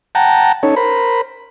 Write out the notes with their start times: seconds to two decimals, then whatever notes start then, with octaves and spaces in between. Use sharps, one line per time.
0.15 F#5 G5 A5 A#5
0.63 C#4 D#4 A4 C#5
0.76 A#4 C5 B5